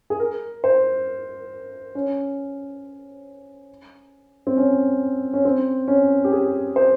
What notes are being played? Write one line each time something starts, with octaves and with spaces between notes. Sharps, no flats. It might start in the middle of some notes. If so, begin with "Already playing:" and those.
G#4
A#4
C5
C#4
C4
C#4
C#4
C4
C#4
G4
G#4
C5